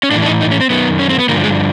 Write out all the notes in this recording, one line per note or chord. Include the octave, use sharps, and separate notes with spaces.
C#4
A2 E3 D4
D4
D#4
D#4
C#4
C4
F#2 D#3 B3
C#4
C4
B3
G2 D3 F3 A#3
G#3